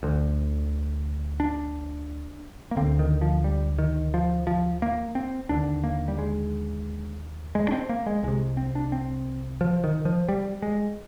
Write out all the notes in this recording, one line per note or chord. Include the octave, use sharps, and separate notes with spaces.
D2 D3
D4
A#3
D2 D3 C4
D#3
F3
G3
D#3
F3
F3
A#3
C4
D#2 D3 D4
A#3
G3
G#3
G#3
D4
C4
A#3
G#3
C2 C3 G#3
C4
D4
C4
F3
D#3
F3
G3
G#3